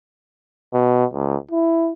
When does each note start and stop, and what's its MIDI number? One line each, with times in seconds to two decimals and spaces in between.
0.73 1.05 47
1.14 1.37 37
1.51 1.92 64